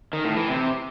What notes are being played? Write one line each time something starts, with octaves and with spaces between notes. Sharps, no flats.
D#3
A2
E3
C3